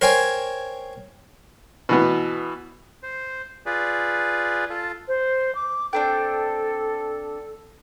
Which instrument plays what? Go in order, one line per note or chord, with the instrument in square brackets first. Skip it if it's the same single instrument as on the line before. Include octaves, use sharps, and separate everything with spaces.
[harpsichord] A#4 C5 C#5 G5 G#5
[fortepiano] B2 E3 B3
[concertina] C5
F4 G#4 B4 D5
F4 A4
[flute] C5
D6
[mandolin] C4 D4 G5 [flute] A4